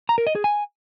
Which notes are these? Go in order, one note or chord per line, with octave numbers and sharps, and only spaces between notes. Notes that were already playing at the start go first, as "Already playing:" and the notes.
A#5
A#4
D#5
G#4
G#5